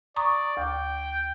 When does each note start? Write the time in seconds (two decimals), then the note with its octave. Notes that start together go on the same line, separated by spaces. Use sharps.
0.16 D5 A#5 C#6 D#6
0.57 D2 G5 D6